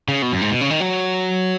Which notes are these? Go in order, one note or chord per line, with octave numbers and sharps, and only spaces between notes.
C#3
B2
F#2
G#2
B2
C#3
D#3
F#3